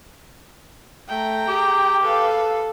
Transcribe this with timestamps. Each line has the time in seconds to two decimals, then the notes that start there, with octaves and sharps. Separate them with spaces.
1.09 A3 G5 A#5
1.48 G4 G#4
2.03 A4 B4 F5